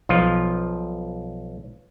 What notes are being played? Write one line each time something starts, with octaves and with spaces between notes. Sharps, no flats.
B1 F3 F4